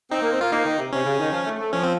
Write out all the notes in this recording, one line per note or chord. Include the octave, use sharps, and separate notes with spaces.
C4 D#4
A#3
C4
A#3 F4
A#3 D#4
D#3
C3
C3 C#4
C#3
D#3
F3
A3
A3
F3 C#4
C4